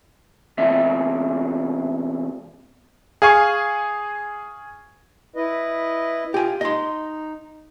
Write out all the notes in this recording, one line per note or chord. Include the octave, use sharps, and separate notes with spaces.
E2 C3 E5
G#4 F5 G#5 C#6
E4 B4 D#5
F4 G4 G#5
D#4 D#5 C6